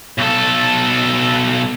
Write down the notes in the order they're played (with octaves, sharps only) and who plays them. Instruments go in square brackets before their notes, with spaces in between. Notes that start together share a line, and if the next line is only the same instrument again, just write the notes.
[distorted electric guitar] B1 A4